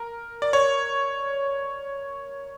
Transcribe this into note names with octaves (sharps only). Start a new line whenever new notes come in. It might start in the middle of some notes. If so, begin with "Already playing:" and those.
Already playing: A#4
D5
C#5